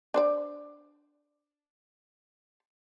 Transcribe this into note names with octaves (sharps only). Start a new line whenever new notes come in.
D4 C5 D5